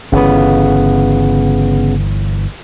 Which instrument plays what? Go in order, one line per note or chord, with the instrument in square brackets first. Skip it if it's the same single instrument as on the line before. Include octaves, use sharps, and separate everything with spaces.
[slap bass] G1 E3 [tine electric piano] C#3 B3